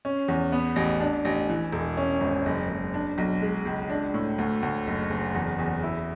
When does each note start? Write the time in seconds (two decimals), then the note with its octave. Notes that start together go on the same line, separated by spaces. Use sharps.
0.05 C#4
0.28 E2
0.52 B3
0.76 A1
1.01 D4
1.25 A1
1.50 E3
1.72 E1
1.97 C#4
2.21 G#1
2.46 F#1
2.69 F#1
2.94 D4
3.18 B1
3.42 G#3
3.65 C#2
3.90 D4
4.14 A2
4.38 D2
4.63 D2
4.87 F#1
5.10 F#1
5.34 E2
5.59 E2
5.83 E4